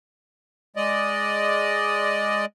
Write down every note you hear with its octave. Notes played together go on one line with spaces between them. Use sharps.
G#3 D5 D#5